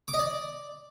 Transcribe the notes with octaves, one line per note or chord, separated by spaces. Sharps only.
D6
D#5
D5